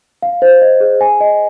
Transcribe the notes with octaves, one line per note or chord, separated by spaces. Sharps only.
F5
C5
D#5
G#4
G#5
D#5